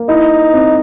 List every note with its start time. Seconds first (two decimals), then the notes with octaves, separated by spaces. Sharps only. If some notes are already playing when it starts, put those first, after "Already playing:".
Already playing: A#3
0.09 D#4 E4
0.54 C4